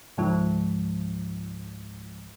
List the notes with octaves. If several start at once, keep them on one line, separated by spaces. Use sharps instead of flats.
C#2 G#2 F3